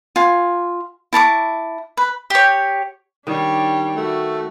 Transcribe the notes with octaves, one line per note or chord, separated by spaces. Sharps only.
F4 G#5
E4 A5 C#6 D6
B4
G4 C#5
D#3 G3 D4 C#5
A3 F#4